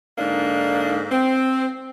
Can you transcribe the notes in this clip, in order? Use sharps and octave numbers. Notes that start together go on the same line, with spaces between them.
G#2 D3 A#3 D4 D#4
C4